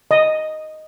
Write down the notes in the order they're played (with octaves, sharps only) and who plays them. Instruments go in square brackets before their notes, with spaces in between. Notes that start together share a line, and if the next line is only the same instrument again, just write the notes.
[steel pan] D#5